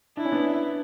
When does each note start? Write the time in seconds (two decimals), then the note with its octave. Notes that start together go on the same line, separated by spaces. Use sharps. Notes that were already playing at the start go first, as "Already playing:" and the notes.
0.17 D4 E4
0.25 C#4
0.32 B3 D4